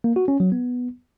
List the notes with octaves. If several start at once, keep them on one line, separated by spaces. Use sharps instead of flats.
A#3
F#4
C#4
F#3
B3